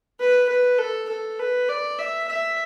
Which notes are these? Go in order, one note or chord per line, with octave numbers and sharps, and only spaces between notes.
B4
B4
A4
A4
B4
D5
E5
E5